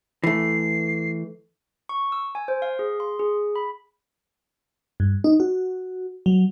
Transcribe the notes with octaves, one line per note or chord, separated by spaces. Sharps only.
E3 A3 C7
C#6
E6
G#5
C5
F5
G#4
C6
G#4
B5
G2
D#4
F#4
F#3